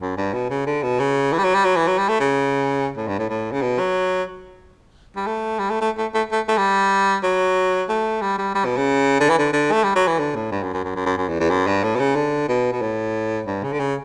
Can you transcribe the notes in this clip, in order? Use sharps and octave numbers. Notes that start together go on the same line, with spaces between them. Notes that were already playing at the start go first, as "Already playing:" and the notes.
F#2
G2
B2
C#3
D3
B2
C#3
E3
G3
F#3
G3
F#3
E3
F#3
G3
A3
C#3
A2
G2
A2
A2
C#3
B2
F#3
G3
A3
G3
A3
A3
A3
A3
A3
A3
G3
F#3
A3
G3
G3
G3
B2
C#3
D3
E3
D3
D3
A3
G3
F#3
E3
D3
A2
G2
F#2
F#2
F#2
F#2
F#2
F#2
E2
E2
F#2
G2
A2
B2
C#3
D3
B2
B2
A2
G2
C#3
D3
C#3